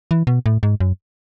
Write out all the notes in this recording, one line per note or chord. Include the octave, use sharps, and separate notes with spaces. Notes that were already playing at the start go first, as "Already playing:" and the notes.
E3
B2
A2
G#2
F#2